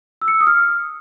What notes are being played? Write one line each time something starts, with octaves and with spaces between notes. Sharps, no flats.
E6
C#7
E6
D#6
F6